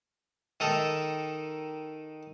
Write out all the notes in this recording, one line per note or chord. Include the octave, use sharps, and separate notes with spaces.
D#3 D#4 A4